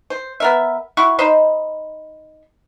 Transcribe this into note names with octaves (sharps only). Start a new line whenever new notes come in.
C5
B3 A#4 E5
E4 F#4 C#6
D#4 C5 D#5 B5